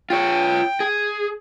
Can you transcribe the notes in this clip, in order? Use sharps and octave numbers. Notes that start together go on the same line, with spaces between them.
F4 C#5 G5
G#4